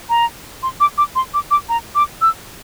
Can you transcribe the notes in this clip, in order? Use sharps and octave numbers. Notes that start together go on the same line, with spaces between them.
A#5
C6
D6
D6
C6
D6
D6
A#5
D6
E6